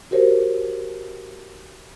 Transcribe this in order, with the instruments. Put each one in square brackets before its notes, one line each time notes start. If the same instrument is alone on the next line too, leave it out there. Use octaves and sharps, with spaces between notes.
[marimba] F#4 G4 A#4 C5 C#5